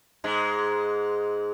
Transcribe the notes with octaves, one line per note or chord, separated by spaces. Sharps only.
G#2 G#3